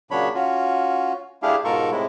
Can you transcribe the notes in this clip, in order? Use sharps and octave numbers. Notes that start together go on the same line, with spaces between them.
A#2 C#3 F#3 D4 C#5 B5
C#4 F4 F#4
A3 D4 E4 G4 G#4 F5
G#2 B2 F4 A4 A#4 C#6
A2 C3 G#3 E4